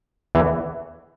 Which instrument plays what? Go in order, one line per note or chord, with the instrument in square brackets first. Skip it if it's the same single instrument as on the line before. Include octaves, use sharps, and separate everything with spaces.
[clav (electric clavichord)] E2 E3